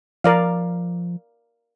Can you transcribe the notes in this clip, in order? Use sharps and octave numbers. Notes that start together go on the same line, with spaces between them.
F3 A#4 D5 F5